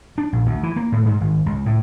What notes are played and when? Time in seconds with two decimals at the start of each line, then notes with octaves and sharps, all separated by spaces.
0.18 D4
0.33 A#1
0.46 D2
0.63 E3
0.76 A#3
0.92 A2
1.06 G#2
1.21 G#1
1.46 C#2
1.66 A2